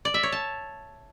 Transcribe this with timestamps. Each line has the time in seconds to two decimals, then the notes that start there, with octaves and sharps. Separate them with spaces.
0.05 D5
0.14 E5
0.23 C#5
0.32 A5